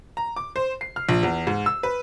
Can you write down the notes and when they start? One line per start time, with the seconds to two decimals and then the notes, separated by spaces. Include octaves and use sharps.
0.17 A#5
0.36 D6
0.56 C5
0.81 C7
0.96 F6
1.09 A#1
1.23 E2
1.47 G#2
1.66 E6
1.83 B4